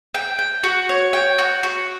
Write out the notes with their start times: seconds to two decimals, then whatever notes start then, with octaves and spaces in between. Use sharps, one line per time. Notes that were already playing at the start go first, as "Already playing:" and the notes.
0.14 G5
0.39 G5
0.63 F#4
0.89 C#5
1.13 G5
1.38 F#4
1.63 F#4